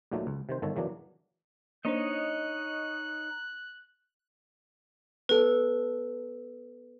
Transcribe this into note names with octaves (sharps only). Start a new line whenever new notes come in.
D#2 A#2 D#3 F#3 A3
C#2
C3 D#3 C5
G1 D#3 A4 C#5
E2 E3 F#3 A#3 D4
A#3 D4 D#4 C5 C#5 D#5 F#6
B3 A4 B4